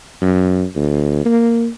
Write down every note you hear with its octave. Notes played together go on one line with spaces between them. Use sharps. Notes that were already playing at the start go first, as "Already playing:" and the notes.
F#2
D2
A#3